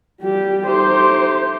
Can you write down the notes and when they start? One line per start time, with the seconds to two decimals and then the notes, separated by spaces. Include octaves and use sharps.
0.21 G3 G4
0.67 A3 D#4 G4 C5